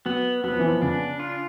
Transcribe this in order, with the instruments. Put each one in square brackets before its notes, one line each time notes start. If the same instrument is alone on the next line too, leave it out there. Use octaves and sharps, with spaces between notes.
[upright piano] F#3 [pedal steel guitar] B3
[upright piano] F#3 [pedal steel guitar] B3
[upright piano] F3
E3
F3
[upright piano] C#3 [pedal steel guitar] D4
[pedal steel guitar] F4